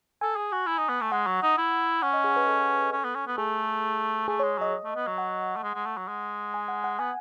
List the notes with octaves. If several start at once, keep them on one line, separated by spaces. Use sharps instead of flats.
A4 G#5
G#4
F#4
E4
D#4
B3
A3
G#3 F#5
F#3
D#4
E4
C#4 F#5
D#5
G#4
B4
A4
C#4
B3
C#4
B3
A3 G#4
A3 G#4
G#3 C#5
F#3 D#5
A3
B3
F#3
F#5
A3
G#3
G#3
A3
F#3
G#3
G#5
F#5
F#5
B3 G#5